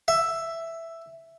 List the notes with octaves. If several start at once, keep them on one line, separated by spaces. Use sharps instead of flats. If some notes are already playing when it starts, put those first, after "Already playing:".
E5